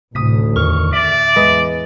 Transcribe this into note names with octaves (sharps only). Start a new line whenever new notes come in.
A1 D2 A2 C3 D#6 B6
E2 D#3 C#6 F6
D5 E5
E2 G#3 B4 D#5